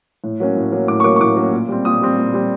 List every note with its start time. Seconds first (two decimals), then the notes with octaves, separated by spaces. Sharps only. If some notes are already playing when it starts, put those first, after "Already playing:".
0.24 A2
0.40 F#3 A#3 C#4
0.57 A2
0.72 F#3 A#3 C#4
0.88 A2 D6
1.00 C#6
1.04 F#3 A#3 C#4 D6
1.16 C#6
1.20 A2 D6
1.36 F#3 A#3 C#4
1.53 A#2
1.69 G3 C4
1.85 A#2 D#6
2.02 G3 C4
2.18 A#2
2.34 G3 C4